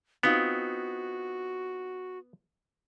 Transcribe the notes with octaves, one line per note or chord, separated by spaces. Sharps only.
B3 C4 D#4 F4 F#4